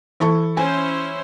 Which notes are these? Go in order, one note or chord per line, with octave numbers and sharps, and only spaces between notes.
E3 E4 A4 C#6
C#4 E4 C5 G#5